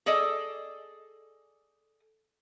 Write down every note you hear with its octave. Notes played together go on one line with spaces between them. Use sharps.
G#4 A4 D5 D#5